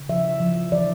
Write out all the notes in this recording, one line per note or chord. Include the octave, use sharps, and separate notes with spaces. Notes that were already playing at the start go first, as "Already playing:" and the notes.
Already playing: C#3
F3 E5
F3
E3 D5